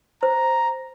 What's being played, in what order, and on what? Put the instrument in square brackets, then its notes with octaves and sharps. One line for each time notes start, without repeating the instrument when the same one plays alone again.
[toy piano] C5 [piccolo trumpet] A#5